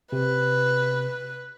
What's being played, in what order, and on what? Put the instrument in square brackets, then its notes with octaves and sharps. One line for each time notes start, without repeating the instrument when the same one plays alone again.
[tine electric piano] C3 [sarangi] B4